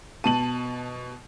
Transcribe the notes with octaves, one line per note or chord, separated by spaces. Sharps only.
B2 A5 D#7 F#7